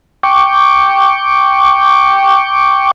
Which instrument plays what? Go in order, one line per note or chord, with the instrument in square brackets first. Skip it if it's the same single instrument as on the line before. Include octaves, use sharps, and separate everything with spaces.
[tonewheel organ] G5 C#6 D6